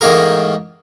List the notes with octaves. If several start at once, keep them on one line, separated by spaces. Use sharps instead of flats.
A1 G#2 D#3 A#3 G#4 A#4